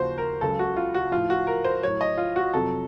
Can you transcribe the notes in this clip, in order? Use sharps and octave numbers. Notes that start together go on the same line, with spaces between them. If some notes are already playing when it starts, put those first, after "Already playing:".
Already playing: D#2 C#3 F3 F#4 C5
A#4
C#2 C#3 F#3 A4
F#4
F4
F#4
A2 F3 F4
F#4
A#4
C5
A2 F#3 C#5
D#5
F4
F#4
F2 C3 F#3 A4